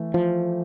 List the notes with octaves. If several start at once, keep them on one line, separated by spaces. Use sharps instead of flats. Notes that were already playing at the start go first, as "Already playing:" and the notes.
Already playing: E3 A3
F3